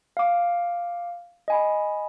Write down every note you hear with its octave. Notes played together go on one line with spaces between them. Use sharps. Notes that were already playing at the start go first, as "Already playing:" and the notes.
F5 D6
D#5 G#5 B5